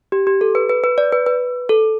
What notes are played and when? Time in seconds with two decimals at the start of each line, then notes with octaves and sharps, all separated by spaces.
0.12 G4
0.27 G4
0.41 A4
0.55 B4
0.69 B4
0.84 B4
0.98 D5
1.12 B4
1.26 B4
1.69 A4